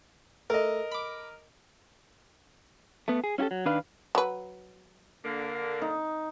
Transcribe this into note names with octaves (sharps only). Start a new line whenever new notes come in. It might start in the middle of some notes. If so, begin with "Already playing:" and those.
A3 A#4 D#5
B5 D6
A3 B3
G#4
C#4 E4 F#4 G4 A4
F#3
D#3 D4 B4 F5
F#3 B4
D3 A#3
D#4